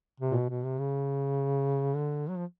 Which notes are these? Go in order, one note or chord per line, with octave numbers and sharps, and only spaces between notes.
C3
A#2
B2
B2
C3
C#3
D3
F#3
F3